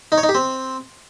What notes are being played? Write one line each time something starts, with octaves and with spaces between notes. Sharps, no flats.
D#4
C#5
D#4
G4
C4